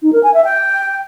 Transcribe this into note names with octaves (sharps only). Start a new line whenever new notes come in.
D#4
A#4
G#5
E5
G5